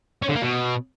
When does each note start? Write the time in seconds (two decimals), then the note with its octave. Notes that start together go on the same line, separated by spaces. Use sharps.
0.22 C#4
0.29 D3
0.35 A#3
0.42 B2